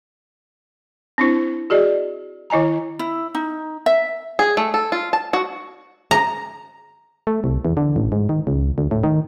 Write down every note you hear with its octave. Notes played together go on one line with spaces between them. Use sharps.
C4 D4 E4 C5
F#4 G#4 D5 D#5
D#3 E4 D#5 G#5 A#5
E4
D#4
E5
G#4
A3
A4
F4
A5
F#4
A#5
A3
C2
E2
D3
A1
G#2
D#3
C#2
D2
A2
D#3